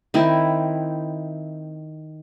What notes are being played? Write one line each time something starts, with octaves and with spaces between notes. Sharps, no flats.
D#3 C4 E4